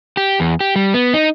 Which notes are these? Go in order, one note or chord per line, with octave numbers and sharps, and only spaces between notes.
G4
E2
G4
G3
B3
D#4